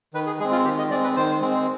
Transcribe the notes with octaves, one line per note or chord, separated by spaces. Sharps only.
D#3 B4
G#4
G#3 C4 G#4
F4
D#3 G4
D#5
G#3 C4 D5
B4
D#3 C5
G#3 C4